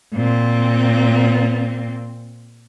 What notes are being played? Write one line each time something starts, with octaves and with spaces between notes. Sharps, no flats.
A#2 C4